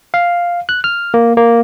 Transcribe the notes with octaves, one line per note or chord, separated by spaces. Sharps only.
F5
F#6
F6
A#3
A#3